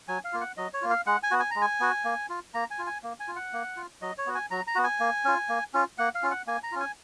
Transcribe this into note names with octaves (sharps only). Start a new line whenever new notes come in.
F#3 G#5
F5
A#3 F4
F#5
F#3 D#5
C#5
A#3 F4
F5
G#3 F#5
G#5
B3 F#4
G#5
G#3 A#5
G#5
B3 F#4
A#3
F4
A#3 A#5
G#5
F4
G#5
A#3
G#5
F4
F#5
A#3
F4
F#3 D#5
C#5
B3 F#4
G#5
F#3 A#5
A#5
B3 F#4
G#5
A#3
C#4 F4
A#3
C#4 F4
A#3 F#5
F5
C#4 F4
F#5
A#3 G#5
A#5
C#4 F4
G#5